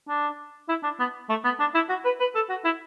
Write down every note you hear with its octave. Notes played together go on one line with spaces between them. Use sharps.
D4
E4
D4
B3
A3
B3
D4
E4
F#4
B4
B4
A4
F#4
E4